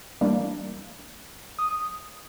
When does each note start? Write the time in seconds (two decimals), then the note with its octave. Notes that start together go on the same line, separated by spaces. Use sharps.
0.21 E3 G3 A#3 D4
1.59 D#6